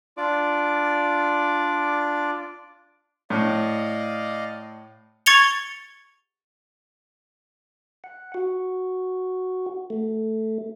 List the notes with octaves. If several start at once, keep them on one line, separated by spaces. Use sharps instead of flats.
D4 F4 D5 D6
A2 D5 D#5 F5
C#6 G#6 A6 C#7 F7 G7
F#5
F#4
A3